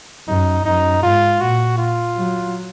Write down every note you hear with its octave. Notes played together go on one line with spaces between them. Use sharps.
F#2 D#4
F#2 D#4
G#2 F4
A#2 F#4
F4
F#3